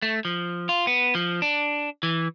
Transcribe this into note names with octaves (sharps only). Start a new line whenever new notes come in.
A3
F3
F4
B3
F3
D4
E3